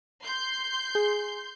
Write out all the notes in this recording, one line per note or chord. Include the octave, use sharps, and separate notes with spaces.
C6 G6
G#4